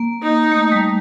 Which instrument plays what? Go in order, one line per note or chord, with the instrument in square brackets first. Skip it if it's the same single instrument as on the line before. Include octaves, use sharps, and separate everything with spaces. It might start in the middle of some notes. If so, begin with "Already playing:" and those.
Already playing: [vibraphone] A#3
[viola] D#4
[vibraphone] A3
G3